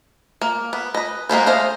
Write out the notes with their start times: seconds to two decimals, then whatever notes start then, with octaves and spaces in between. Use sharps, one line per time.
0.41 A#3
0.73 B3
0.95 B4 D#5
1.29 G#3 A#3 B3 C5
1.46 A3 A4 C5 D#5 F5